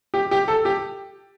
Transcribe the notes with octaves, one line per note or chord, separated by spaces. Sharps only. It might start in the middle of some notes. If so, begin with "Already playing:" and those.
G4
G4
A4
G4